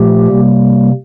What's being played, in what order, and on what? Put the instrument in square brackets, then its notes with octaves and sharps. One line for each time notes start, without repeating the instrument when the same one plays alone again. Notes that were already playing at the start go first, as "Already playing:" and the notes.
Already playing: [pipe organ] A#2 F3 A3 G4
C3 G3 A#3